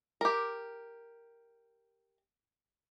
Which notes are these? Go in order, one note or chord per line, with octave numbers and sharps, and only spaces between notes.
G4 A#4